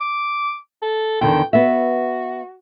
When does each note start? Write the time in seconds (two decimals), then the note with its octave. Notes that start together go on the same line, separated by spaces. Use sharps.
0.01 D6
0.82 A4
1.21 E2 D3 D#3 G5
1.53 B3 F#4 E5